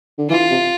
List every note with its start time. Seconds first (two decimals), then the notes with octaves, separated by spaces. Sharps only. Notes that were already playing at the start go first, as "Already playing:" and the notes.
0.18 D3
0.30 E3 F4
0.51 C3